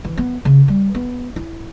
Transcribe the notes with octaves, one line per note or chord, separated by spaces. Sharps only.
E3
B3
C#3
G3
B3
E4